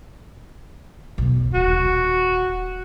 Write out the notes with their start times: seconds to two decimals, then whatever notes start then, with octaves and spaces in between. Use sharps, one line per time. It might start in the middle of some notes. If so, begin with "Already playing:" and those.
1.18 B1 E2
1.54 D#1 F#4